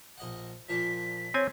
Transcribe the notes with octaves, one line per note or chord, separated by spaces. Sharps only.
A#1 D#5 F#5
A#2 F3 D4 B6
C4 C#5 G#5